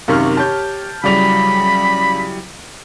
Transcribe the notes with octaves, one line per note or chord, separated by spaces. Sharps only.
F#2 C3 D#3 F5 C#6 F6
G4 C#5 A5 G6
C#3 F#3 G3 E4 D5 B5 F7